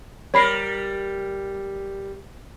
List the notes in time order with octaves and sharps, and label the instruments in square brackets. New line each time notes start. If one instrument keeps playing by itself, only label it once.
[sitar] G3 A#4 [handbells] C#5 B5 C7